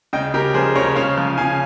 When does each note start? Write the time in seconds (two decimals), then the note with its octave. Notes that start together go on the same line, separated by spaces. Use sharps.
0.13 C#3 D#5 G5
0.34 C#3 G4 A#4
0.54 F3 G#4 C5
0.75 C#3 A#4 C#5
0.96 C#3 C#5 F5
1.18 F3
1.38 C#3 F5 G#5